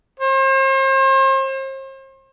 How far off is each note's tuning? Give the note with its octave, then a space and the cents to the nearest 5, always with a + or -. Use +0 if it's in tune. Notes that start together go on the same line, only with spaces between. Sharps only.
C5 +40